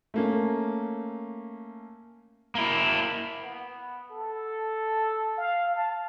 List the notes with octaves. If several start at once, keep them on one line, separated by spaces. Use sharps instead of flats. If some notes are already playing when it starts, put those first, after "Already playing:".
A3 A#3 C#4
A#3 E4
B3
A4
F5
A5